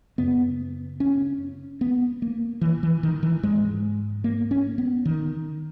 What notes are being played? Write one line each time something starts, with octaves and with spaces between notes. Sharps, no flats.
F#2 C#3 B3
C#4
B3
A#3
E3
E3
D#3
E3
G#2 G#3
A#3
C#4
B3
D#3